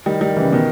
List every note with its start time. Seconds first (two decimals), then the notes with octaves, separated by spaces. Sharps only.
0.06 D#3 G3
0.21 D#3 G3
0.37 C#3 E3
0.52 B2 D#3